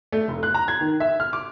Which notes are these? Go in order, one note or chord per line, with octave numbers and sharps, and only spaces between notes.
A3
F1
F#6
A#5
G#6
D#3
E5
F6
D6